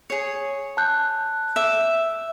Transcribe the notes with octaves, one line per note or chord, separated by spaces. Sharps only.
G#4 C#5
A5 F#6 G6
E5 D6